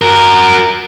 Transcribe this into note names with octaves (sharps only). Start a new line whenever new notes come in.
F#4 A#4